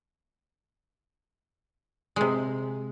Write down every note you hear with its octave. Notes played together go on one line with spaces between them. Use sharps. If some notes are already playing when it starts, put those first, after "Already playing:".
C3 G#3